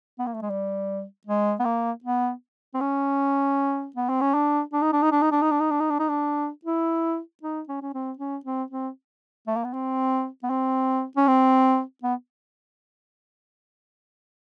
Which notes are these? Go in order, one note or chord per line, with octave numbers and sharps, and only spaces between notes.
B3
A#3
A3
G#3
G3
G#3
B3
A#3
B3
C4
C#4
B3
C4
C#4
D4
D4
D#4
D4
D#4
D4
D#4
D4
D#4
D4
D#4
D4
D#4
D4
D#4
D4
E4
D#4
C#4
C#4
C4
C#4
C4
C4
A3
A#3
B3
C4
B3
C4
C#4
C4
B3